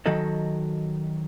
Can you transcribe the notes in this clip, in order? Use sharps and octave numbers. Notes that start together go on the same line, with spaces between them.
D#3 F#3 F#4 A4 D#5